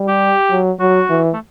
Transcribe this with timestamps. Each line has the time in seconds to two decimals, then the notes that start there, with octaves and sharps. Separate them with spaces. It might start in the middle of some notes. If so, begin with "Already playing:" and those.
Already playing: G3
0.08 G4
0.51 F#3
0.79 F#3 F#4
1.10 E3
1.34 A3